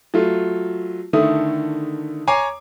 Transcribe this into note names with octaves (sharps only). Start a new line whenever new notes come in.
F#3 A3 F4
D3 D#3 A3 E4 D#6
C#5 G#5 A#5 D6 C7